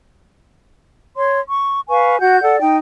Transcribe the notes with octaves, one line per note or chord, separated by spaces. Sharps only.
C#5 C6
C#6
B4 F5 G#5 C#6
F#4 F#5 G6
A4 D5 F#5
D#4 G5